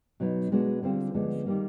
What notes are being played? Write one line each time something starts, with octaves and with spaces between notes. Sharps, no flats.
B2 F#3 B3 D#4
B2 G#3 B3 D4 F#4
D3 G3 C4 F4
D2 D3 F3 G#3 B3
D#3 G3 A#3